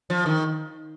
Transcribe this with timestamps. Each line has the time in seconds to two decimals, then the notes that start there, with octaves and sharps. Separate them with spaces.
0.10 F3
0.26 D#3